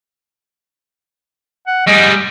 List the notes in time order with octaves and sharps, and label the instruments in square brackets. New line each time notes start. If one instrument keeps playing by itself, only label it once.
[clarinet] F#5
[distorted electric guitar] G3 G#4 [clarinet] D#5